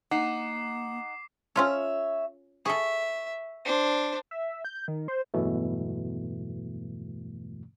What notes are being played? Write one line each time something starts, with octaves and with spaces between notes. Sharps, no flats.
A#3 D#4 F#5 D6 C7
C#4 F4 A4 C#5 E5
G#4 A4 E5 C#6
D4 C5
E5
G6
D#3
C5
E2 G2 B2 E3 F#3 A3